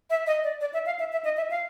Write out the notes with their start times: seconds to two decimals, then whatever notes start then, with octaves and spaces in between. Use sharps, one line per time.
0.10 E5
0.27 D#5
0.44 D5
0.61 D5
0.73 E5
0.86 F5
0.99 E5
1.12 E5
1.24 D#5
1.37 E5
1.50 F5